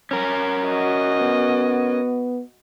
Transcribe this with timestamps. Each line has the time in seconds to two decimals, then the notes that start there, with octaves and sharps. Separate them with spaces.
0.11 C#4 A#4
0.66 F#4 D#5
1.20 B3